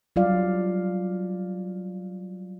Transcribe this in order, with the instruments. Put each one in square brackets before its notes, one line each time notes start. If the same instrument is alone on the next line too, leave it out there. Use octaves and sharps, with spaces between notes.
[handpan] F#3 G3 F4 D5 F5